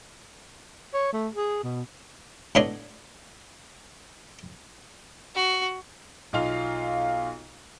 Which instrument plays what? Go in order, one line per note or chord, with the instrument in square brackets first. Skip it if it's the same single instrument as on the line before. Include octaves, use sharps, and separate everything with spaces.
[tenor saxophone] C#5
A3
G#4
B2
[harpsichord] A2 B3 D4 C#5 D#5 C6
[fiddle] F#4
[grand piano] B1 D#4 F4 F5 F7